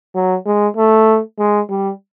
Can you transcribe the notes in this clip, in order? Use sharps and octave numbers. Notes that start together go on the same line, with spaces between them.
F#3
G#3
A3
G#3
G3